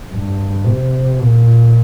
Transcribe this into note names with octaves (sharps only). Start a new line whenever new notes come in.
G2
C3
A#2